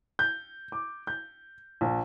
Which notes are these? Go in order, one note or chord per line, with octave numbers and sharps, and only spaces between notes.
G6
D6
G6
A#1